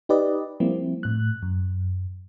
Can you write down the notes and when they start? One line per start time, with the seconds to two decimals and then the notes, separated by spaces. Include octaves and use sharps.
0.09 D#4 G4 B4 D5 D#5
0.60 F3 G3 A#3 C4 E4
1.03 A2 F#6
1.43 F#2